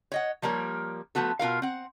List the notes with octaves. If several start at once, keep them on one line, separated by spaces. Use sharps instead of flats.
C#5 D#5 F#5
F3 G3 A#3 A#4 C#5
F3 A3 B3 F#4 A4
B2 F4 A#4 F5
C4 F#5